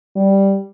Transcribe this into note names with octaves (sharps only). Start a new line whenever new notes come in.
G3